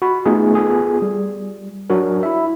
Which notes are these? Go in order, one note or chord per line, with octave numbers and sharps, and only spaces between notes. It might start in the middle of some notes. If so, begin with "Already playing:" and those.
F#4 B5
A3 B3 D#4 F4 G#4
B3 F4 G#4 A4
G3
F#3 D4 F#4 A#4
E4 E5